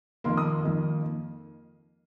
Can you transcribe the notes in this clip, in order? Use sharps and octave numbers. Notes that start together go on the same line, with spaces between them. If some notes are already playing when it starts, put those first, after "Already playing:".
F2 D#3 A#3 C6
D#6
F2 D#3 A#3